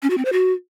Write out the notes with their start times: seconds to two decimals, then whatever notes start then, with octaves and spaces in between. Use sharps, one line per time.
0.03 C#4
0.10 F#4
0.18 C4
0.25 C5
0.32 F#4